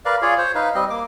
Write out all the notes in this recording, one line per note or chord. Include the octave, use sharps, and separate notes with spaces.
A#4 B4 D5 F5
F4 G#4 C#5 D5
C5 C#5
D#4 B4 F5
G3 C4 D#5
A#3 D6